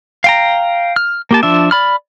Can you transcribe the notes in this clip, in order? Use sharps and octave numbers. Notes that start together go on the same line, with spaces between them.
F5 G5 A#5
F6
A#3 G4 A5
F3 D4 E5
D5 B5 F6